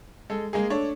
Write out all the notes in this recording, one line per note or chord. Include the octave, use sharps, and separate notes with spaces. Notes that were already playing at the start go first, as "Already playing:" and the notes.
G#3 A4
G#3 A#3 G#4
A3 D4 C#5